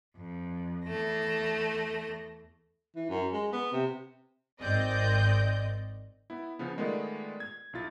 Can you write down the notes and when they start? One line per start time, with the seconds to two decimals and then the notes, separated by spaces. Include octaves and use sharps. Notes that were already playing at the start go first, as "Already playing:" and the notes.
0.16 F2
0.87 E2 A3 A#6
2.96 E3
3.09 F#2
3.33 G#3
3.52 B3
3.72 C3
4.61 G#1 C4 D5 D#5 G6
6.30 B3 E4
6.59 C#3 F3 B3
6.77 D#3 G#3 A3 B3 F4 D5
7.40 G#6
7.73 B1 E4 F4 A6